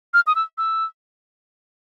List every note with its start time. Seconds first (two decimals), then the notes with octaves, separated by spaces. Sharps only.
0.14 F6
0.27 D#6
0.35 E6
0.58 E6